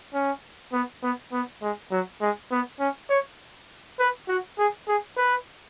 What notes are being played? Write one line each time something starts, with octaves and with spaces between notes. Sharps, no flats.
C#4
B3
B3
B3
G#3
F#3
G#3
B3
C#4
C#5
B4
F#4
G#4
G#4
B4